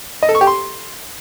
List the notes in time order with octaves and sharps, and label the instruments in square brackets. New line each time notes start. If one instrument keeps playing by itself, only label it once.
[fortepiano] D#5
A4
C#6
G4
C6